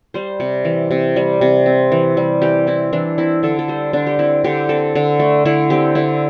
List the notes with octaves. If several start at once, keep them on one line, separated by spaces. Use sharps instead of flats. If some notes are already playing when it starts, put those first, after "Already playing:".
G3 C5
C3
E3
C3
G3
C3
C4
E3
G3
E3 G4
C4 E4
E3 D4
C4 E4
D3 A4
A4
G3 C5
D3 D4
G4
C4 E4
D3 G4
C4 A4
D3
A3
D3 E4
C4 G4
D3 E4